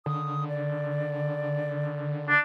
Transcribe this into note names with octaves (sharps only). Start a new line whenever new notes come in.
D3 D#6
D5
D4